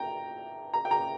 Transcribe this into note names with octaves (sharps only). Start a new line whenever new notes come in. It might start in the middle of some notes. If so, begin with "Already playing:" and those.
Already playing: G5 A#5
A#5
G5
A#5